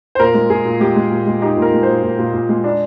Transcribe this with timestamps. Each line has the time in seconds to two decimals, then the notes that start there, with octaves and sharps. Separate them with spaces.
0.15 C5
0.19 A#2 A#4
0.34 G#3
0.50 A#2 G#4
0.65 A#2
0.80 G#3 G4
0.96 G#3
1.11 A#2
1.27 G#3
1.42 D#4 G4
1.57 A#2
1.62 A#4
1.73 G#3
1.83 C5
1.88 A#2
2.03 A#2
2.18 A#2
2.34 A#2
2.49 G#3
2.64 D4